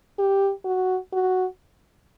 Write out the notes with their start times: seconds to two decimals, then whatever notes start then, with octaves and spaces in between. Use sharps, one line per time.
0.19 G4
0.65 F#4
1.13 F#4